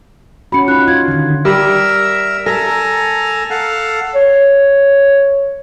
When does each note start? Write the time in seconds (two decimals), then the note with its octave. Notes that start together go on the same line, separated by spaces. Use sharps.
0.52 C#4 F#4 B5 C#7
0.68 D#4 F4 F#6
0.88 F4 G#6
1.08 D3 D#3
1.45 G3 A#4 E5
2.46 A4 A#4 G#5 A#5
3.50 A4 F5 F#5
4.15 C#5